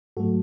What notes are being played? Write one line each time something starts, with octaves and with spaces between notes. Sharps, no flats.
G#2 F#3 A3 F#4 A4